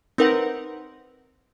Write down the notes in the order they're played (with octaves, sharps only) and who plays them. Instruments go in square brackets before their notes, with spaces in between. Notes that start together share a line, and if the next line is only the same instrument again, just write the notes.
[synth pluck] C4 D#4 A#4 B4 F#5